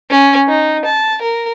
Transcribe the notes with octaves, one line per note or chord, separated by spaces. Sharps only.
C#4
D#4
A5
A#4